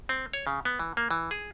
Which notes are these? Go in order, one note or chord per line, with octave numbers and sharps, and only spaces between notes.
C4
C#5
C#3
B3
E3
A#3
E3
G#4